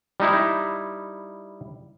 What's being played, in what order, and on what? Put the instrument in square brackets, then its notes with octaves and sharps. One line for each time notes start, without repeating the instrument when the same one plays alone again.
[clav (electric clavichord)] G3 D#4 E4